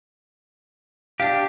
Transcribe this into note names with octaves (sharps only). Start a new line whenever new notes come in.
D4 G4 F5